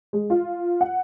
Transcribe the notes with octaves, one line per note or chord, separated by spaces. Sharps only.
G#3
F4
F#5